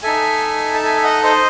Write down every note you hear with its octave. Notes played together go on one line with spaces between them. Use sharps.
D#4 A4 E5 G#5
A5
E5 G#5
E5
D#5 F#5
C5 D#5